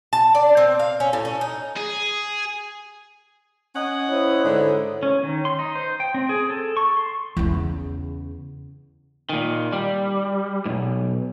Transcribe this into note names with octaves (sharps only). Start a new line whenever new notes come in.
A5
D5
C4
F5
C#4
A2
C#4
D#4
G#4
C#4 D#5 F#5
E4 C5 C#5
G#2 D3
C#4
D#3
C6
D#4
C5
G5
C4
G#4
A4
C#6
C6
E2 C#3
A#2 D#3
G3
B1 G#2